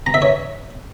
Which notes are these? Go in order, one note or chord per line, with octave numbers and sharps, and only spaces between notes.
A#5
E5
C#5